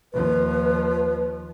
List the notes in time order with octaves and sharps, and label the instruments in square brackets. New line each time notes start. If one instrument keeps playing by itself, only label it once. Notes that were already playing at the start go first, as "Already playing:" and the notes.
[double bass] D#2 F3 [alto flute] B4